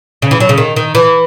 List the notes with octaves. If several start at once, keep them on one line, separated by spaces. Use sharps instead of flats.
C#3
E3
F#3
C#3
D#3
D#3
E3